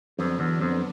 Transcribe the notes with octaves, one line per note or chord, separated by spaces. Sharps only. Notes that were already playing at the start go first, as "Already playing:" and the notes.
F2 D3 F#3 B3 D4
E2
F2